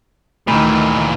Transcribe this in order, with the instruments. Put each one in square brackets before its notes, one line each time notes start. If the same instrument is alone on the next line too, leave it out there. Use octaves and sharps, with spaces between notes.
[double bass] D2 D#3 [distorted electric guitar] A#2 E3 [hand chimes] A3 B5